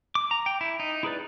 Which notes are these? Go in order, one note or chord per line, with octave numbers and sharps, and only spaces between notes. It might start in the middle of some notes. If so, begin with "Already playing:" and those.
D6
A#5
G5
E4
D#4
E4 G#4 B4 D5